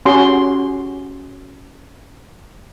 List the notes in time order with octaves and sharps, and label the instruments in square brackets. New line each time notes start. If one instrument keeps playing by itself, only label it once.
[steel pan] C#4 F#4 G4 C6